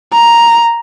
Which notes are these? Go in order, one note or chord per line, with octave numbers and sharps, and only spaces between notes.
A#5